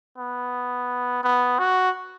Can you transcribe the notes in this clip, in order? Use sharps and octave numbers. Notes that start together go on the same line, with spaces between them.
B3
B3
F#4